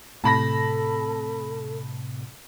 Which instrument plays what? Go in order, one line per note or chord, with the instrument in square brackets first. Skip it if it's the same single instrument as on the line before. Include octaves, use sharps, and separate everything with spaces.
[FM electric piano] A2 C3 [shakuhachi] A4 [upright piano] A5 B5 A#6